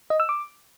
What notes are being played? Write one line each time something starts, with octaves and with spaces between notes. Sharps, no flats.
D#5
E6
D6